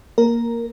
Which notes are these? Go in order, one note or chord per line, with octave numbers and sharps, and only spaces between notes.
A#3 A#4